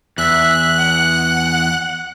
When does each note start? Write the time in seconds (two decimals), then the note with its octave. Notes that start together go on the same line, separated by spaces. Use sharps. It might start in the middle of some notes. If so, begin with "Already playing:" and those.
0.18 E2 E5 F#6
0.78 F#5